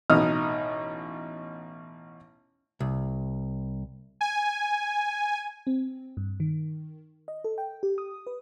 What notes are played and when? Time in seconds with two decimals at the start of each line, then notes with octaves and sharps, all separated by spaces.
0.10 A1 B2 D#4 D#6 F6
2.80 C2
4.21 G#5
5.67 C4
6.17 G2
6.40 D#3
7.28 D#5
7.44 A4
7.58 G5
7.83 G4
7.98 D#6
8.27 B4